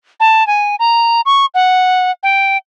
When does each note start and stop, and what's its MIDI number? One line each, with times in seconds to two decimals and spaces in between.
0.20 0.46 81
0.47 0.75 80
0.79 1.21 82
1.26 1.46 85
1.54 2.11 78
2.23 2.57 79